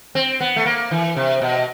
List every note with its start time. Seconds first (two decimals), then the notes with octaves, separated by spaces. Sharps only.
0.15 C4
0.41 B3
0.56 A3
0.66 A#3
0.91 E3
1.16 C3
1.42 B2